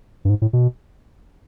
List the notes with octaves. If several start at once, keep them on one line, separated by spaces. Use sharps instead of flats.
G2
G#2
A2
B2